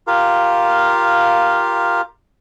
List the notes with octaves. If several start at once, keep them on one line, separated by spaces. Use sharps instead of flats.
F4 G4 A#4 F5